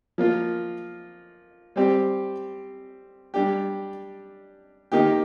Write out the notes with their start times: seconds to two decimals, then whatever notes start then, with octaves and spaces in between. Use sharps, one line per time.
0.18 F3 A#3 F4
1.76 G3 C4 G4
3.34 G3 D4 G4
4.92 D#3 A#3 D#4 G4